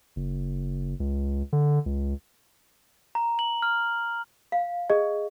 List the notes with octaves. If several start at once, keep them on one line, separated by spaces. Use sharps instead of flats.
F#1
C#2
D3
C#2
A#5
F#7
F6
F5
G#4 D#5